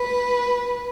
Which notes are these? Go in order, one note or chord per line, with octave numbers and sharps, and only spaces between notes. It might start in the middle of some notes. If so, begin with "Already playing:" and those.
Already playing: B4